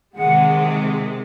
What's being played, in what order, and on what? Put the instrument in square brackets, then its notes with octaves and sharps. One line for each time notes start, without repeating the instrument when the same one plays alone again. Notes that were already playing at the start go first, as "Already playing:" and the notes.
[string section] C3 D#3 G#3 [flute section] F#5